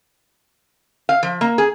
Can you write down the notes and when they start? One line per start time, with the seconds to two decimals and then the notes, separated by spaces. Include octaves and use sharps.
1.09 F5
1.23 F3
1.41 A#3
1.58 G#4